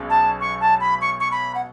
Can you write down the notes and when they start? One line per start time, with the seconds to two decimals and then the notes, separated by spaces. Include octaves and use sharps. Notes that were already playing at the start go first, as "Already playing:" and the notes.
Already playing: B1 B2 G#3 C#4
0.10 A5
0.41 C#6
0.61 A5
0.80 B5
1.01 C#6
1.20 C#6
1.32 B5
1.55 F#5